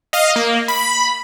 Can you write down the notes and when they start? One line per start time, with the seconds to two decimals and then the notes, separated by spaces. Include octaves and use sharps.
0.13 D#5 F5
0.36 A#3
0.68 B5